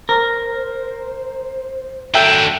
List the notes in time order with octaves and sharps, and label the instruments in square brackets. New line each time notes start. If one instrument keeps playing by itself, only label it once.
[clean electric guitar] A#4 [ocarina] C5
[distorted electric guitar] F#3 D4 [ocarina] A4 [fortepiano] E5 G5